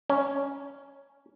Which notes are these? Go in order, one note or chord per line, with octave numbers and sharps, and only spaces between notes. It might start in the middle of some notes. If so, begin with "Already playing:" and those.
C#4